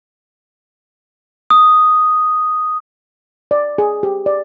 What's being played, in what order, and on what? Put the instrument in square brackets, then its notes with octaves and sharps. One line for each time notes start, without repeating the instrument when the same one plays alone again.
[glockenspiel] D#6
[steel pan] D5
G#4
G4
D5